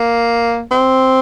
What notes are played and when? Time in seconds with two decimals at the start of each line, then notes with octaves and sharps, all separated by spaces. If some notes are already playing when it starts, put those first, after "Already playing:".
Already playing: A#3
0.71 C4